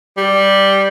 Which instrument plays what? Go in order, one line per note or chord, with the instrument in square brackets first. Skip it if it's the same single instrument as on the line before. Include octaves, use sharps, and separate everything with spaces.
[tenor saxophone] G3